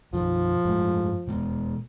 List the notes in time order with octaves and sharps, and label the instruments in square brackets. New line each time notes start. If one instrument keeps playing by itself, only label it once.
[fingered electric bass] F#2 B2 [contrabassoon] F3
[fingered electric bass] G2 G#3 A3
B2 G#3 B3